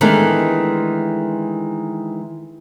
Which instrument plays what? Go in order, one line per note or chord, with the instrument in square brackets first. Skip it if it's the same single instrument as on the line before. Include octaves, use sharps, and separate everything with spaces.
[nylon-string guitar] D#3 E3 G#3 A3 B3 D4